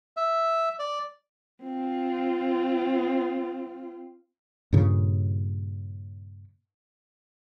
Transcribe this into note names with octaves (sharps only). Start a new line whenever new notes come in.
E5
D5
C4 F4
G2 A#2 C#3